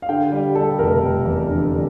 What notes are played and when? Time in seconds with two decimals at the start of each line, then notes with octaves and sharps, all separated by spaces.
0.02 F5
0.09 D3 G5
0.32 G3
0.55 G3 A4
0.79 F1 A#4
1.02 F1
1.26 E2
1.49 D3
1.73 G3